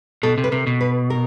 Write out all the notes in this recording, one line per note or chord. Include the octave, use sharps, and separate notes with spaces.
B2 A4
C3
B4
C3 A#4
B2
B4
A#4